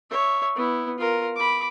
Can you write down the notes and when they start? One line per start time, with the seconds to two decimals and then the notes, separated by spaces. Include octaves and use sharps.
0.10 C#5 E5
0.56 B3 E4
0.98 F4 A#4
1.36 B5 D6